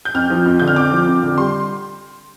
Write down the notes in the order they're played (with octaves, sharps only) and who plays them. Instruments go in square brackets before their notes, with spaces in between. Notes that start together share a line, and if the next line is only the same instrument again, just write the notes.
[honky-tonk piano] G6
F2 F6
F3
F2
D3 G6
F6
F2 D6
F3
F2
D3
G3 C6